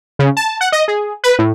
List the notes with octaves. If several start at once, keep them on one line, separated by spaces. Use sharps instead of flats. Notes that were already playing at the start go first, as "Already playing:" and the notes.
C#3
A5
F#5
D#5
G#4
B4
A2